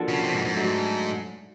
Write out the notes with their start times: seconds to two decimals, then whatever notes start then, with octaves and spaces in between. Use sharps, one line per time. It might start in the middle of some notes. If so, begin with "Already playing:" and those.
Already playing: F3 A#3 D4 F#4 A4
0.09 C#3
0.24 C3
0.34 G#2
0.45 G#2
0.55 F#3 A3 D4